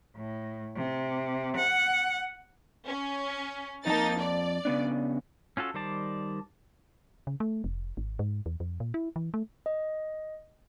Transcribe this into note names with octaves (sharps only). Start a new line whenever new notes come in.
A2
C3
F#5
C#4
F2 A#3 D#4 A5 A6
D5
C#3 B3 D4
C#4 F4 F#4 A4
D#3 G3 C5 D5 A5
C#3
A3
F1
G#1
G#2
E2
F2
A#2
E4
E3
A3
D#5